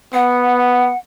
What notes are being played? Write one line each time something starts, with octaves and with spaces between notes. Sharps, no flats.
B3 F#5